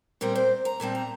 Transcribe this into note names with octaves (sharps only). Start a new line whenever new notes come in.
A#2 G3 C4 A#4
C5
A#5
A#2 G3 C4 A5
A#5